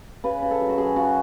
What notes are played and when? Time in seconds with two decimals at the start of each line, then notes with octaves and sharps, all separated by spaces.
0.24 C#3 B4
0.42 C#3
0.51 A4
0.60 F#2
0.69 F#4
0.78 F#2 G#4
0.96 C#3 F#4